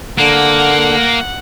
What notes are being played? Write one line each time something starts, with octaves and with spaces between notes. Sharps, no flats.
D3 A#3 F#5